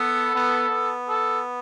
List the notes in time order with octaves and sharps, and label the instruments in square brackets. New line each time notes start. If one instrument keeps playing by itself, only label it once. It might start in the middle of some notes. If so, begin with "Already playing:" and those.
Already playing: [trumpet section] B3 [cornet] A4
[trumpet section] B3
B3
[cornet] A4